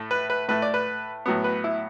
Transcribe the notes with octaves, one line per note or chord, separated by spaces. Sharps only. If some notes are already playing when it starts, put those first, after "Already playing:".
Already playing: A2 A3
B4
B4
A2 A3 B4
D5
B4
A2 F#3 B3
B4
E4